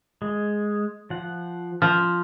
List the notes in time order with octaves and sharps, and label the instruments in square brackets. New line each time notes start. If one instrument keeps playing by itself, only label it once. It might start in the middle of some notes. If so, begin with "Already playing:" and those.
[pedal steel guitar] G#3
F3 F#5
[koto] F3 [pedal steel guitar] F6